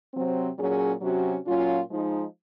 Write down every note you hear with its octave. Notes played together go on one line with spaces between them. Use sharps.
C3 F#3 C4
A#2 F#3 C#4 G#4
C3 F#3 C#4 F#4
A#2 F#3 C#4 F4
F3 G#3 D#4